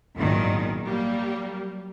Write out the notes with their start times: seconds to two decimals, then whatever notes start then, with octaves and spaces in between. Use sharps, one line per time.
0.15 G#1 E2 A#2 D#3 F#3
0.85 F#3 G3 A#3